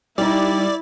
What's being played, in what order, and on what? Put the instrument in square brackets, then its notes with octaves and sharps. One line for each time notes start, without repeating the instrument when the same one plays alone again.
[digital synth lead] G3 [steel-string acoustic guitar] D#4 G4 [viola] E4 [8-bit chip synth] D5